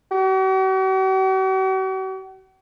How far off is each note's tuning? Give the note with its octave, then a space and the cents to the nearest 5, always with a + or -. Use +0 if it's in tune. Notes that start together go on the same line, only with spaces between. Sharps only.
F#4 +45